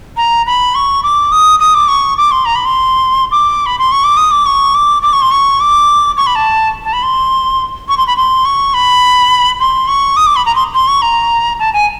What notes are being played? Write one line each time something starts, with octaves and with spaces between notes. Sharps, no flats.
A#5
B5
C#6
D6
D#6
D#6
D6
C#6
D6
C6
A#5
B5
C6
D6
B5
C6
C#6
D6
D#6
D6
C#6
D6
D6
C#6
C6
C#6
D6
C#6
B5
A5
A5
B5
C6
C#6
C6
B5
C6
C#6
B5
C6
C#6
D#6
D6
B5
A#5
C6
C6
C#6
A#5
A5
G#5